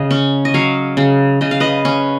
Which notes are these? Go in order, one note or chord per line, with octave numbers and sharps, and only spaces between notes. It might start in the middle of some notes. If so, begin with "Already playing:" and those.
Already playing: C#3 D#5
C#4
D#5
F#3 C#5 F5
C#3
C#3 D#5
F5
B4 D#5
C#4